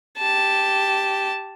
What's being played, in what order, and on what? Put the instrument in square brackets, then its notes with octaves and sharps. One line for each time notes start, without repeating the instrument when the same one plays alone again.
[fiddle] G4 A5